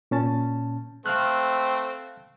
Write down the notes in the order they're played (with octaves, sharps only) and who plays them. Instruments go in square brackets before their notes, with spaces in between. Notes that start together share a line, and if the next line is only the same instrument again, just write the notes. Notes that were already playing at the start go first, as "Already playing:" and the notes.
[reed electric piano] A#2 C#4 A5
[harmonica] A3 C4 [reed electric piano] F5 F6 F#6